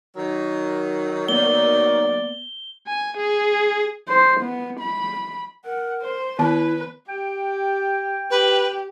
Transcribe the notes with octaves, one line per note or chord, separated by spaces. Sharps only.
D#3 F#3
A#3 B3 D5 G7
G#5
G#4
C5
B3
B5
A#4 F#5
C5
D#3 B3 E4 B4 A5
G4 G5
G4 B4